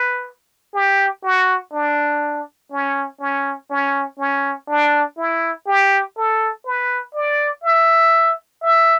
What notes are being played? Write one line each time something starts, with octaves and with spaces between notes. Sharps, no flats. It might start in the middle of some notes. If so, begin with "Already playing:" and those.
Already playing: B4
G4
F#4
D4
C#4
C#4
C#4
C#4
D4
E4
G4
A4
B4
D5
E5
E5